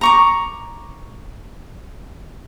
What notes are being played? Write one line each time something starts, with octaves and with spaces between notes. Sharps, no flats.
A#5 C#6 D6